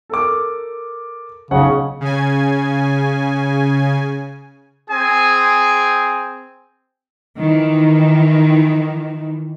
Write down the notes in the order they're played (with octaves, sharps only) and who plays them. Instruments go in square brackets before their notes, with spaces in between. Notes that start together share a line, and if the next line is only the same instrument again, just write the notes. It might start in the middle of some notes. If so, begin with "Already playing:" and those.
[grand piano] A4 A#4 D6
[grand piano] B1 C#4 F#5 [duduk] C#3
[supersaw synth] C#3 G#5
[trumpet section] C4 G#4 G#5
[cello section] D#3 E3